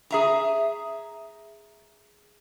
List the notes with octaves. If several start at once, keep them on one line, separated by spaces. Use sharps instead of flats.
G#4 E5 A#5